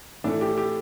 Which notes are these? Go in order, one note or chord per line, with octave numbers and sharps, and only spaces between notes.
A2 E3 A3 D4
G4
G4